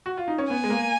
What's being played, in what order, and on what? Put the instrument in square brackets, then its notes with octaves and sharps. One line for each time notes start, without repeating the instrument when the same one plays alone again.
[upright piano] F#4
F4
D#4
C#4
[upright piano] B3 [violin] G#5
[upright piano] G#3
A#3